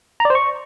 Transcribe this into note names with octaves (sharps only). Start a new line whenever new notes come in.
A#5
D5
C5
C#6